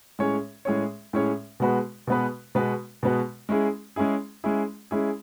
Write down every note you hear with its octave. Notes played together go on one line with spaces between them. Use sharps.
A2 G#3 C#4 G#4 C#5
A2 G#3 C#4 G#4 C#5
A2 G#3 C#4 G#4 C#5
B2 G#3 B3 F#4 B4
B2 G#3 B3 F#4 B4
B2 G#3 B3 F#4 B4
B2 G#3 B3 F#4 B4
G#3 C#4 E4 G#4
G#3 C#4 E4 G#4
G#3 C#4 E4 G#4
G#3 C#4 E4 G#4